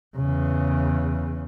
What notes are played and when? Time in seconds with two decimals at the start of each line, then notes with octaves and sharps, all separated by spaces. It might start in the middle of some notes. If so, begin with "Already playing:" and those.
0.16 E2 C#3